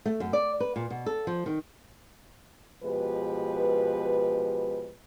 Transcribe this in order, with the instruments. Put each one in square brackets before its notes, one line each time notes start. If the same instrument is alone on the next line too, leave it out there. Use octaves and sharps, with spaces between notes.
[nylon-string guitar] A3
F#2
D5
B4
A#2
B2
A4
F3
D#3
[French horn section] B2 F3 G#3 G4 B4